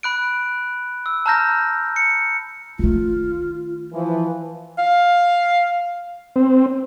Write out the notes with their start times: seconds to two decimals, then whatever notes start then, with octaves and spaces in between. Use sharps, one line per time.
0.03 B5 F#6 D7
1.06 E6
1.26 A5 A#5 F6 G6 A#6
1.96 C#7
2.79 D#3 A3 F4
3.93 E3 F3 B4
4.78 F5
6.36 C4